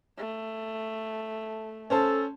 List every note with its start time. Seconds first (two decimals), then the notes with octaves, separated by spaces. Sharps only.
0.18 A3
1.90 C#4 A4 C5 A5